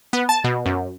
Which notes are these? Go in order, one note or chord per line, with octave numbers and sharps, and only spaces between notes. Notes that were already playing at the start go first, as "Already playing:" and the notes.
B3
A5
B2
F#2